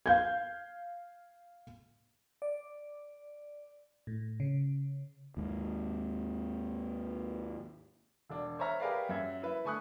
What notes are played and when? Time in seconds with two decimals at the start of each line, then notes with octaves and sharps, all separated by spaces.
0.06 F5 G6 G#6
2.42 D5
4.07 A2
4.40 C#3
5.37 D#2 G#2
8.30 E1 D4
8.59 C5 C#5 E5 A#5 F6
8.80 G4 G#4 A#4 B4 D5 F5
9.09 F#2 E5 G#6
9.42 E4 B4 E5
9.64 D3 A3 G#5 C#6 D#6 F#6